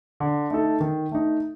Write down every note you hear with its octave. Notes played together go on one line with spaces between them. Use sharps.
D3
A3 D#4 A4
D#3
A3 D#4